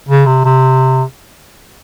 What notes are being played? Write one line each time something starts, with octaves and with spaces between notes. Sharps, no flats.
C#3
C3
C3